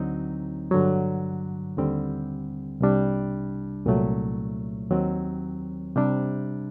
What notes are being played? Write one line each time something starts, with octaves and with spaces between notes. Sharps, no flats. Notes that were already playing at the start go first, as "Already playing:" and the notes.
Already playing: D2 D3 F#3 C4 D#4
G2 D3 F#3
D#2 D3 G3 C4
C2 C3 G3 D4
C2 A#2 F#3 A3
D#2 D#3 F#3 C4
C3 G3 D4